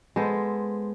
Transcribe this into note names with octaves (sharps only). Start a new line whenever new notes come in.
G#3 B3 A4 C5